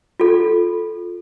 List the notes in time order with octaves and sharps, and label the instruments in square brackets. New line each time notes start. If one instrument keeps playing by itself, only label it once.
[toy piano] F4 A4